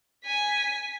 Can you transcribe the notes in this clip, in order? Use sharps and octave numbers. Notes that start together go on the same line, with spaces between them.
G#5 B6